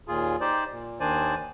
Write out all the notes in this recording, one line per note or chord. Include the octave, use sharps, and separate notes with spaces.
D#2 A#2 F4 G#4
D#4 G4 C5 D5
A#2
D#2 D#3 D4 C5 D5 G#5